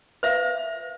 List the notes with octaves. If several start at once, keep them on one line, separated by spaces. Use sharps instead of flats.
B4 E5 F5